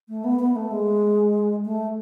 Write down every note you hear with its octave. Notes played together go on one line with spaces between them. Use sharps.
A3
B3
B3
A3
G#3
A3